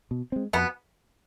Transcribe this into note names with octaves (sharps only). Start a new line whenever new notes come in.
B2
G#3 C4
F2 B2 B3